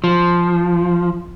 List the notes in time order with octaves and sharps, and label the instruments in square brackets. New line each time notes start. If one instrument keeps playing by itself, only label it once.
[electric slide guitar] F3